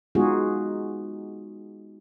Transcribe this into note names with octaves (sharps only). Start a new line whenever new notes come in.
G#3 B3 D#4 F4 F#4 G#4